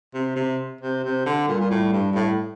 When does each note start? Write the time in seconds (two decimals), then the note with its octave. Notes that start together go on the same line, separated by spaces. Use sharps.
0.14 C3
0.36 C3
0.81 C3
1.04 C3
1.26 D3
1.48 A#2 G3
1.60 A#2
1.70 A2
1.93 G2
2.12 G2
2.15 A2